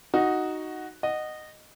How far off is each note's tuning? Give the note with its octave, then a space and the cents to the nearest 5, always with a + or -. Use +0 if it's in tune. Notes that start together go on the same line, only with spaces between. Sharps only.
D#4 +0 F#4 +0
D#5 -15 F#5 +5